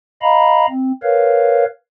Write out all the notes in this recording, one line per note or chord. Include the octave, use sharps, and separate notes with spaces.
D#5 F5 A#5 B5
C4
A#4 B4 C#5 F5